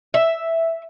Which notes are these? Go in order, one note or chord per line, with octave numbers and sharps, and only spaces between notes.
E5